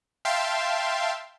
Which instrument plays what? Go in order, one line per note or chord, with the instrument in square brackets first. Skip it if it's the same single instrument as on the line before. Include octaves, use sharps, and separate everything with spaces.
[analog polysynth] E5 F5 G5 A5 C6